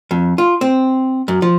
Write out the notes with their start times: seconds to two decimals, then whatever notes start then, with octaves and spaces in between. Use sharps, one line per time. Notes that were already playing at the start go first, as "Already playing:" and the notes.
0.11 F2
0.38 F4
0.61 C4
1.28 F#2
1.42 F3